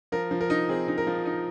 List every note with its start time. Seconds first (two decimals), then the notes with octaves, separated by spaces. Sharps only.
0.12 F3 A#4
0.31 F3
0.41 A#4
0.50 D#4
0.69 C4 G#4
0.88 D#4
0.98 A#4
1.07 F3
1.26 D#4